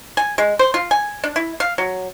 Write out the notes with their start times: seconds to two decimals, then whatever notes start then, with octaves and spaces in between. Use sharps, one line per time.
0.17 G#5
0.38 G#3
0.59 C5
0.74 F4
0.91 G#5
1.24 D4
1.36 E4
1.60 F5
1.78 F#3